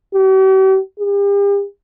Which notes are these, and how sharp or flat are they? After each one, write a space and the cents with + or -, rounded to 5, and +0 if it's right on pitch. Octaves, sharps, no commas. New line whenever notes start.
G4 -45
G4 +40